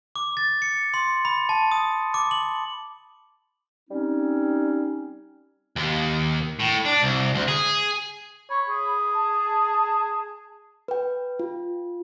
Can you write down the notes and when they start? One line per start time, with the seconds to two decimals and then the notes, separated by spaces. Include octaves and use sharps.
0.16 D6
0.37 A6
0.62 C#7
0.94 C6
1.25 B5
1.49 A5
1.71 D#6
2.14 D6
2.31 F#7
3.90 G3 C4 C#4 D#4
5.76 D#2
6.59 A2
6.85 D4
7.03 C2
7.35 D2
7.48 G#4
8.50 C#5 B5
8.69 G#4
9.14 A5
10.88 B4 G5
11.40 F4